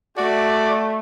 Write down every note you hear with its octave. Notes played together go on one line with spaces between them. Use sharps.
A3 F#4 D5